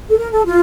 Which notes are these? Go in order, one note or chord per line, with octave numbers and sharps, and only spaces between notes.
A4
A#4
A4
F4